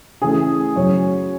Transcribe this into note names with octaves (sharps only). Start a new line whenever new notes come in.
C#3 E3 A3 C#4 G#4
F#2 C#3 F#3 C#5